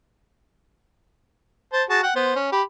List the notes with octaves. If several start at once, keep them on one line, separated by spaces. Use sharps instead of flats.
C5 A5
F#4 G#4 A5
F#5 G5
B3 C5
C#4
G4 B5